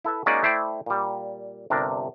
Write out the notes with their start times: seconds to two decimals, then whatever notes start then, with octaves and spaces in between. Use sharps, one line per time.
0.04 E4 A4 B4 E5
0.26 G#3 A#3 C#4 D#4 F#4 D5
0.43 A3 E4 C5 D5 G5
0.86 A#2 G3
1.70 G1 C3 D4 A#4